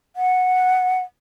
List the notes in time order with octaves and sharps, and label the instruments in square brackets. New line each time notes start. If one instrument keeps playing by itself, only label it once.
[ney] F#5